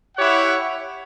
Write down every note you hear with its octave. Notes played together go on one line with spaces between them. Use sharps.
E4 G4 C#5 F#5